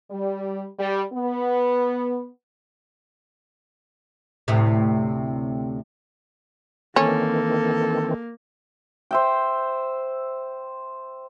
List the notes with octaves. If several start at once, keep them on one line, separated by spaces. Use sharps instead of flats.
G3
G3
B3
D2 A2 C3
D#3 E3 A#3 C4 C#4 A4
C5 E5 G5